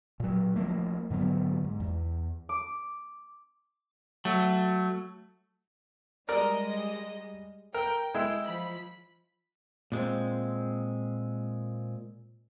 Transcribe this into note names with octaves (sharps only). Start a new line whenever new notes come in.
A#2 F#3
F3 F#3 A3 A#3
G#2 D3 F#3 B3
G#2
E2
D6
F#3 A3
G3 G#3 A#4 D5 D#5
A#4 G5
G#3 E4
F3 B5
A#2 G#3 C4